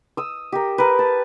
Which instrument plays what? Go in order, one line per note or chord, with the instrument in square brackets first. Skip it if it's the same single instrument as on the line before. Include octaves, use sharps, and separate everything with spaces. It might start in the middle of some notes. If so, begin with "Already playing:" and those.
[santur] D#6 E6
G4 A#4
A#4 B4
A5